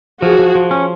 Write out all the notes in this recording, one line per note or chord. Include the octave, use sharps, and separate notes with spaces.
F3 F#4 G#4
F3
F3
C#4